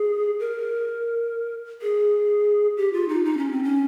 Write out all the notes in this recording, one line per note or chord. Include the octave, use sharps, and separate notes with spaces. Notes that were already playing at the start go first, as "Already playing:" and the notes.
Already playing: G#4
A#4
G#4
G4
F4
D#4
D#4
C#4
C4
C#4